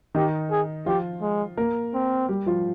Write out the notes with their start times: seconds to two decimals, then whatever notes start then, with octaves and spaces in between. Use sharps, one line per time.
0.14 D#3 D#4 G4
0.51 G#4
0.86 F3 F4 G4
1.21 G#3
1.57 A#3 A#4
1.94 C4
2.29 G3 G4
2.46 F3 F4